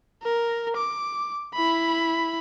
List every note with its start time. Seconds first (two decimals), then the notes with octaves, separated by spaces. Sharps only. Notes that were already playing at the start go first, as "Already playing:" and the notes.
0.23 A#4
0.77 D6
1.54 E4 B5